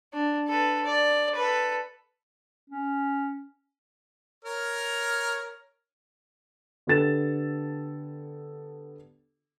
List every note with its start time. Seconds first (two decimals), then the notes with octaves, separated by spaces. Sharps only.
0.13 D4
0.48 A4 B4
0.85 D5
1.36 A4 B4
2.70 C#4
4.45 A#4 C#5 F6
6.87 D3 B3 G4 A4 A6 E7